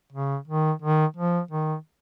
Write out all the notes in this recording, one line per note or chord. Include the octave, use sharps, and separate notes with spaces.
C#3
D#3
D#3
F3
D#3